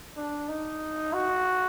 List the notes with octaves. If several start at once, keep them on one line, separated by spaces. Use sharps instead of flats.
D4
D#4
F#4